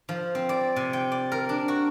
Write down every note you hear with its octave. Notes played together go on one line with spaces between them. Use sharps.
F3
C4
D5
C3
G5
D5
A#4
D4
F#4